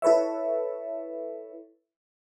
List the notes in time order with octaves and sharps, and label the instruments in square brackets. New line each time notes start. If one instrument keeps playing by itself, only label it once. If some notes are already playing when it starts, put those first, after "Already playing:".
[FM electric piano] E4 A4 B4 C#5 E5